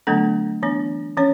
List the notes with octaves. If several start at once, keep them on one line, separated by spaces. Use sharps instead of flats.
D3 F#3 A3 B3 D4 A4
E3 B3 D4
E3 C#4 C#5